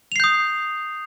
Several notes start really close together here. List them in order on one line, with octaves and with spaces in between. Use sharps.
F7 C7 G6 D#6